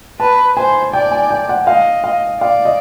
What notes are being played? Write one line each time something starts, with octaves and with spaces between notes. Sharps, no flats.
B4 A5
C5 G#5
D5 G5
G#5
G5
F#5
D#5 F5
F5
D5 F5
D#5